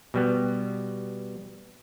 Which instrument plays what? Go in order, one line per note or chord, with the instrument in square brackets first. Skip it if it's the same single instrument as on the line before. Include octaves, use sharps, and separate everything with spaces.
[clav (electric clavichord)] B2 G3 B3